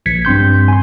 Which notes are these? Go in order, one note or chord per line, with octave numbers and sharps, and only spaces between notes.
A#1 G#6 B6 C#7
G2 C4 C6 G6
G#5 C6